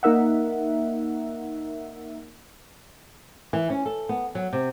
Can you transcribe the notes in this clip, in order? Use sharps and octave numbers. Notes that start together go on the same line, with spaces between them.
A#3 D#4 A#4 E5 F#5
E3
C#4
A4
B3
F#3
C3